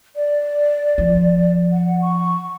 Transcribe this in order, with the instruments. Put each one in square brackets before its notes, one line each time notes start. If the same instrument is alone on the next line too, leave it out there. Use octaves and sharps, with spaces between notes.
[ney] D5
[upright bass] F3
[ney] F#5
C#6